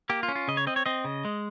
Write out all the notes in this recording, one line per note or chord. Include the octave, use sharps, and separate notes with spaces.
A#3 G4
F4
C#4
F4
C#3 D#5
C#5
C4 D#5
C#5
C4 D#5
C#3
G#3